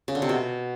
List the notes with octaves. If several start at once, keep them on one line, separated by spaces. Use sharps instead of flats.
C#3
D3
C3
B2